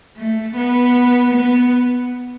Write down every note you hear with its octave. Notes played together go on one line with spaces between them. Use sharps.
A3
B3
B3